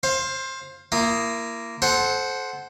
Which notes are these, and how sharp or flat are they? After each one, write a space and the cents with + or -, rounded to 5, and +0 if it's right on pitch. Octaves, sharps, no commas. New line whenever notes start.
C5 +20 F5 +0
A#3 +0 E4 +40 D#6 +0
A4 -30 C5 +0 F#5 +0